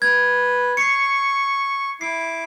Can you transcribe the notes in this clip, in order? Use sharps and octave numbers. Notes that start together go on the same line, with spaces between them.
B4 G#6
C#6 C7 C#7
E4 D6 C7